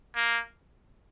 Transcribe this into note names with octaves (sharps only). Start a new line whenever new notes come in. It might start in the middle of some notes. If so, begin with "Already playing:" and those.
A#3